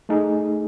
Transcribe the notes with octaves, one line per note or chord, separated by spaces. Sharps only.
A3 D#4 G#4